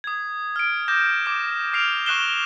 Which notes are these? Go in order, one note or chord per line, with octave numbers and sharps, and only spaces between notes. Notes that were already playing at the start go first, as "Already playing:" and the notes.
D#6 G#6
F6 D7
D6 G6 A#6 E7
D6 D#6 G6 D7 E7
F6 C7 D7 F7
C#6 F6 F#6 C7 E7 G7